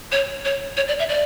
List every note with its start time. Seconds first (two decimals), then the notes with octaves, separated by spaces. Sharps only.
0.12 C#5
0.45 C#5
0.77 C#5
0.88 D5
0.99 E5
1.09 D5